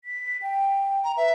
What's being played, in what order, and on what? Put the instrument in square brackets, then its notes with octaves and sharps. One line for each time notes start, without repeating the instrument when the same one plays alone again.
[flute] B6
G5
[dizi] A#5
[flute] B4 [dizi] E5